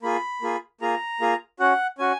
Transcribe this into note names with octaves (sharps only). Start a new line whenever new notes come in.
A#3 F4 G#4 B5
A#3 F4 G#4
A#3 F4 G#4 A#5
A#3 F4 G#4
C#4 F#4 F#5
C#4 F#4 G#5